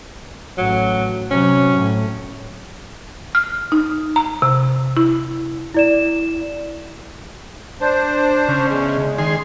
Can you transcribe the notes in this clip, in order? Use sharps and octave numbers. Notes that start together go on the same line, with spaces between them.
A1 F#3
C3 F#3 C#4
A2
F6
D#4
A#5
C3
E4
E4 D5 E7
D4 C5
C#3
E2 G#3
D#3 G#4 C6